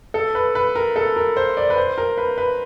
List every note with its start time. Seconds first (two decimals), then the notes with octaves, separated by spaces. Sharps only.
0.14 A4
0.35 B4
0.55 B4
0.75 A#4
0.96 A4
1.16 A#4
1.37 C5
1.57 D5
1.70 B4
1.77 C5
1.98 A#4
2.18 B4
2.38 B4